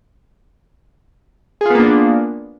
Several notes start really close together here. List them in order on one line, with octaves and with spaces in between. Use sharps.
G#4 F4 B3 A#3 D4